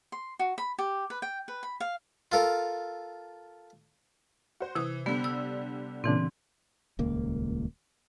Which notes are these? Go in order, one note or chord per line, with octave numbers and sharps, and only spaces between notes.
C6
F#4
B5
G4
B4
G5
B4
B5
F5
F4 A4 A#4
F#4 C5
C3 E3 D#6
D3 G3 B3
E6
A#2 C#3 E3 C4 D4
D#1 C#2 A#3